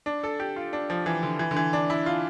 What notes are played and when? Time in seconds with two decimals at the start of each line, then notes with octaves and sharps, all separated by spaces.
0.06 D4
0.24 A4
0.40 G4
0.56 F4
0.73 D4
0.90 F3
1.06 E3
1.23 D3
1.39 E3
1.51 D3
1.56 E3
1.73 D4
1.90 E4
2.06 F4